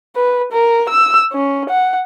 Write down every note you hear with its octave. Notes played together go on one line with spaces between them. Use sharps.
B4
A#4
E6
C#4
F#5